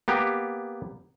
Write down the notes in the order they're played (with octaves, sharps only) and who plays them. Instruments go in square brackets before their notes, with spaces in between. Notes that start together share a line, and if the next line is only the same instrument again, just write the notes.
[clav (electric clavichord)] A#3 B3 G4